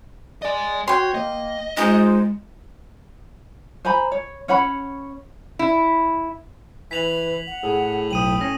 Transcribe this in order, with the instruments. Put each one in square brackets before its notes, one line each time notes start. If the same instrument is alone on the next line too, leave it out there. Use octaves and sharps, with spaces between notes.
[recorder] D5 [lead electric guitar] D#5 G#5
[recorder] F#4 [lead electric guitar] C#5 [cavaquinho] G5 C6
[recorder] A#3 [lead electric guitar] D#5
[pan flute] G#3 [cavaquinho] D#4 G#4 C5 [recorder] F4
[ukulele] C5 G#5 A#5 B5
C#5
C#4 C#5 F#5 B5
[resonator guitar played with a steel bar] E4
[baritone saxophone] E3 [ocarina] B4 [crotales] B6 F7 F#7
[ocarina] F#5
[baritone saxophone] A2 [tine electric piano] G#4
[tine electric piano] B1 [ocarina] G5 [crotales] D#6 D#7 F#7
[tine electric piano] C#4 [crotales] A#6